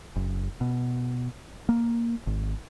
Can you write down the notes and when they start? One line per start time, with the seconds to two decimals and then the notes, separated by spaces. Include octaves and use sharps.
0.16 F#1
0.61 B2
1.69 A#3
2.27 G#1